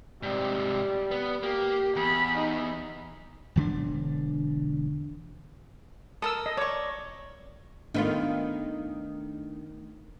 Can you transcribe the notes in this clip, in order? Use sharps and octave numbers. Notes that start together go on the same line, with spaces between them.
G#2 C3 G3
B3
A#3 G4
E2 B5
D#4
E1 D3 C#4 D4
A4 A#4 D#6 E6
D#5
C#5 D5 C#6
D#3 A3 B3 D4 F4